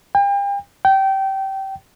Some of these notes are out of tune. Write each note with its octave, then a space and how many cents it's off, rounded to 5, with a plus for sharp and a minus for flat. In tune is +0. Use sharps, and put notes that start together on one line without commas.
G5 +40
G5 -20